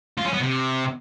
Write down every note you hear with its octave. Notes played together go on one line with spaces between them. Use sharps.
F4
C#4
B3
C3